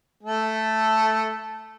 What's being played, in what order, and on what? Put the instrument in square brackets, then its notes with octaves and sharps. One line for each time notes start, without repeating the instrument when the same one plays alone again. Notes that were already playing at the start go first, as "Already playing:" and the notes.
[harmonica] A3 A4